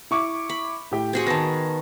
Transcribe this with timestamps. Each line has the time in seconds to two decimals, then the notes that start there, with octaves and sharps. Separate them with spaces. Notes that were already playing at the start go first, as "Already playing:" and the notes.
0.11 E4 C#6 D6
0.49 B5
0.91 A2 G4 G5
1.13 C4 F#4 G#4
1.27 D#3 B3 A5 A#6